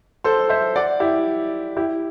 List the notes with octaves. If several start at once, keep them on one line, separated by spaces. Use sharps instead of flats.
A4 C5
C5 E5
D5 F#5
E4 G4
E4 G4